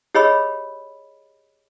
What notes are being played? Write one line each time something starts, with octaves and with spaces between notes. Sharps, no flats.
G4 G#4 C#5 D#5 B5 E6